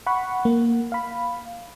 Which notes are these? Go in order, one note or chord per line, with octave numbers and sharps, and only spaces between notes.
F#5 B5 C#6
A#3
F5 B5